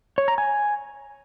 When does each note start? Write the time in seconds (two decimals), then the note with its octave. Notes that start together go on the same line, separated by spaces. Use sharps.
0.18 C#5
0.28 A#5
0.38 G#5